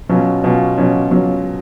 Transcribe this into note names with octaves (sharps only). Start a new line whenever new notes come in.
B2 F#3 C#4 F4
B2 F#3 C#4 F4
B2 F#3 C#4 F4
B2 F#3 C#4 F4